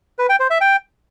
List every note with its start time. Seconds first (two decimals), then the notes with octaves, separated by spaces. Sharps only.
0.19 B4
0.29 G5
0.40 C5
0.50 E5
0.61 G5